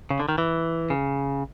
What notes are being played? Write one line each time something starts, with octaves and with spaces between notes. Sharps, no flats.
C#3
D3
D#3
E3
C#3